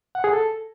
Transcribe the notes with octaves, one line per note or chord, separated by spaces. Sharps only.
F#5
G#4
A4